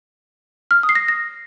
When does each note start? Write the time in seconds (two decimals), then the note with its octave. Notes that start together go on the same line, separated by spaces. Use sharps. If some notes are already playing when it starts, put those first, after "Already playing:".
0.71 F6
0.83 D#6
0.89 C7
0.95 A#6
1.08 A#6